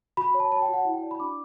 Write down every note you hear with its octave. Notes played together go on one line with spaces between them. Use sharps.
F#4 B5
C#5
A5
C#5 A5
G5
F#4 F#5
E4
G5
D5 A5
B5
D4 D6